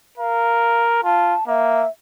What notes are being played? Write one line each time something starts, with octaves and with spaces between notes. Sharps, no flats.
A#4 F5
F4 A5
A#3 E5